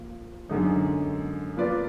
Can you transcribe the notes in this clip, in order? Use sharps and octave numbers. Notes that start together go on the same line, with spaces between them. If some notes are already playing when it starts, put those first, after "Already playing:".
Already playing: F3 A#3
F#2 D3 G#3 D#4
F3 A#3 F4 B4 D5